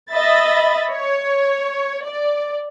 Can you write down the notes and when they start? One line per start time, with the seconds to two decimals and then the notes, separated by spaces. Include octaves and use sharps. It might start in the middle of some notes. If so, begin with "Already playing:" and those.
0.11 D#5 E5 B5 A6
0.92 C#5
2.06 D5